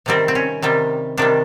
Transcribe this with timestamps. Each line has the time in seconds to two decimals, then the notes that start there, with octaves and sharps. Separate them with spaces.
0.06 C3 D#3 G3 C4
0.28 C4
0.35 C#4
0.62 C3 D#3 G3
1.17 C3 D#3 G3 D4